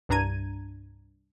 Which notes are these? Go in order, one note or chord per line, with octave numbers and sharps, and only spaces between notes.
C2 G2 D4 A#5 G#6 D#7